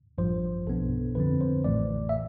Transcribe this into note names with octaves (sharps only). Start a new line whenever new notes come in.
A1 G2 F3 C5
B1 B2 B3 D4 A4
F2 D3 F3 C4 B4
C5
A1 A2 E3 A3 D5
E5